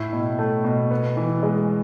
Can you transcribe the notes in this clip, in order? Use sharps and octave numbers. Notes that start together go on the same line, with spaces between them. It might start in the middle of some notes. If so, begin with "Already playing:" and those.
Already playing: A2 E4
B2
A3
B2
B3
E3
G#3